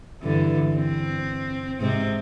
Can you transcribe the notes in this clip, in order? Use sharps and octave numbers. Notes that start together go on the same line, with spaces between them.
G2 D3 E3
C4
G#2 C3 C4